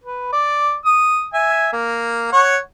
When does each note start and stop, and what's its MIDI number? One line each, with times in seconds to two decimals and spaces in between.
0.04 0.29 71
0.33 0.75 74
0.86 1.26 87
1.34 1.70 76
1.34 1.70 80
1.73 2.32 58
2.32 2.57 73
2.32 2.57 78